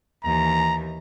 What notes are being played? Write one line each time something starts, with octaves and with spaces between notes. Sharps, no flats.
D#2 E3 A#5